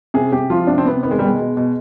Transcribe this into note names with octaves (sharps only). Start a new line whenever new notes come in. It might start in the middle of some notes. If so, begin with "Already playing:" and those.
C3 G#4
C3 G4
F3 F4
C3 D4
C4
C3 B3
D#3 B3
G#3
B2 G3
G#3
B2
B2